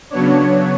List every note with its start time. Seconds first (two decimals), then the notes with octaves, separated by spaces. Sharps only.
0.10 C#3 F#3 B3 D4 C#5